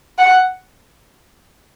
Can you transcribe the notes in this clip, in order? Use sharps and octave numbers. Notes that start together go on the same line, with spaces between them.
F#5